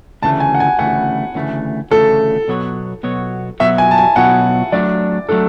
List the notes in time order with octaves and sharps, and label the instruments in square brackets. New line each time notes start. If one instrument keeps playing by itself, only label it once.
[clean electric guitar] D2 C#3 E3 A3 [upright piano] A5
[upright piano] G#5
F#5
G#5
[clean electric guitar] D2 C#3 E3 A3 [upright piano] F#5
[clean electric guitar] D2 C#3 E3 A3
[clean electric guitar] D2 C#3 E3 A3 [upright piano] A4
[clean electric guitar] B2 F#3 B3 F#4 C#5
B2 F#3 B3 F#4 C#5
[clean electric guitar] B2 F#3 B3 F#4 C#5 [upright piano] E5
[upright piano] G#5
A5
G#5
[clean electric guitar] B2 F#3 B3 F#4 C#5 [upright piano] F#5
[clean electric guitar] F#3 A3 D4 [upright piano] D5
[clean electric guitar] F#3 A3 D4 [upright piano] A4